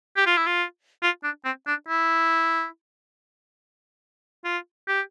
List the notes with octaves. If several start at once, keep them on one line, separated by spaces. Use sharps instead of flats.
G4
F4
E4
F4
F4
D4
C4
D4
E4
F4
G4